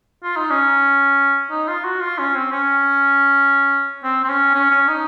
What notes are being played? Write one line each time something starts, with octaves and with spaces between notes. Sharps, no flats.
F4
D#4
C#4
D#4
F4
F#4
F4
C#4
C4
C#4
C4
C4
C#4
C#4
C#4
D#4